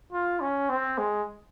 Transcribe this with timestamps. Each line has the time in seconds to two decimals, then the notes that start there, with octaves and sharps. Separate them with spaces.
0.12 F4
0.40 C#4
0.69 C4
0.98 G#3